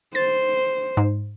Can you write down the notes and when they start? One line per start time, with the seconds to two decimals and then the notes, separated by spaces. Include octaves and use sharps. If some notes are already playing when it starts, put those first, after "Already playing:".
0.15 C5 A6
0.97 G#2